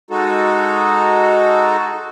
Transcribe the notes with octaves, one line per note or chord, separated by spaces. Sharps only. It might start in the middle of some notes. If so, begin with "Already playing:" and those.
G#3 D#4 F#4 A4